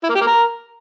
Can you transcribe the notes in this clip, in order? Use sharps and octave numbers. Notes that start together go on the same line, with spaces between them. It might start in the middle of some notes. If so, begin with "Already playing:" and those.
E4
A#3
G4
A#3
A#4